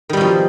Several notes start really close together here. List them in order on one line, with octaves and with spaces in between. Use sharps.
D#3 G3 B2 F3